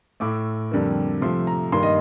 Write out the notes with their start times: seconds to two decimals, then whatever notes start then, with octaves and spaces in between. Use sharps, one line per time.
0.20 A2 A3 D6
0.71 F2 D3 G3 A#3
1.21 C3 F3 A3 C6
1.47 A#5
1.72 G2 D#3 G3 A#3 C6
1.83 D#5